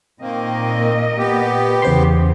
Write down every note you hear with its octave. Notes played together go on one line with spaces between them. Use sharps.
A#2 D#3 A#3 C4 A#4 D#5
B3 G4
E2 C#3 C5 C6